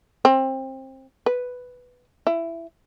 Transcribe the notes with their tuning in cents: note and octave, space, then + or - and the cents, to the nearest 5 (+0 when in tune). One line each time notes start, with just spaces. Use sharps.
C4 +25
B4 +5
E4 +15